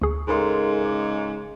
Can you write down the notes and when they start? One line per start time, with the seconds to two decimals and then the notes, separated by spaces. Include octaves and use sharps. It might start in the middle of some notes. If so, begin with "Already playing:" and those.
0.01 D2 G#4 C#6
0.28 G#2 C#3 G#3 A4 A#4 C6
0.81 D#5 D6